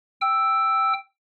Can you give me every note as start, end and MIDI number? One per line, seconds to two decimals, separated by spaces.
0.21 0.93 79
0.21 0.93 88